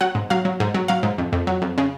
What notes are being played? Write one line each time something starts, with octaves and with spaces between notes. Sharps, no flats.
F#3 F#5
G#2
F#3 F5
F#3
G#2
F#3
F#3 F5
G#2
F2
F2
F#3
F2
C#3